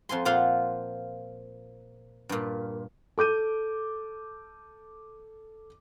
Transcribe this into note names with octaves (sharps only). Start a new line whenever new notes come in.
F2 F3 G#5 C6
A#2 F3 F4 F5 F#5 C6
G2 A#2
A4 D6 G6 D#7